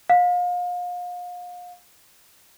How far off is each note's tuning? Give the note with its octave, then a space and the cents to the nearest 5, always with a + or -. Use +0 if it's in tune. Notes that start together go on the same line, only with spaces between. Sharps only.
F5 +35